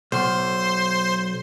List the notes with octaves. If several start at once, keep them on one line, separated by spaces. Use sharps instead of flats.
B1 C5 C6